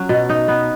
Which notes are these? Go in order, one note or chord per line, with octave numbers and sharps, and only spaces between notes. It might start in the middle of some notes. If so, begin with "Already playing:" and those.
Already playing: F#3 C#4
B2
D#4
B3